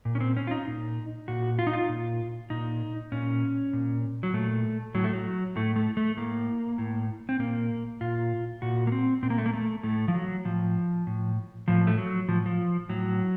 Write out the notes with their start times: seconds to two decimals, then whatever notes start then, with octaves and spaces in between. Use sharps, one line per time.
0.05 A#2
0.15 C#4
0.21 C4
0.37 C#4
0.47 F4
0.51 D#4
0.68 A#2
1.28 A#2 F#4
1.59 F4
1.67 D#4
1.73 F4
1.89 A#2
2.50 A#2 D#4
3.12 A#2 C#4
3.73 A#2
4.23 F#3
4.33 A#2 A3
4.94 A2 F#3
5.04 A3
5.13 F#3
5.56 A2 A3
5.76 A3
5.97 A3
6.17 A2 A#3
6.78 A2
7.29 C4
7.39 A#2 A#3
8.01 A#2 F4
8.62 A#2 F#4
8.87 A#3
8.92 C4
9.23 A#2 C4
9.30 A#3
9.38 A3
9.46 A#3
9.53 A3
9.83 A2 A3
10.08 F3
10.14 F#3
10.45 A2 F3
11.07 A2
11.68 A2 F3
11.87 A3
11.98 F#3
12.28 A2 F3
12.46 F3
12.89 A2 F#3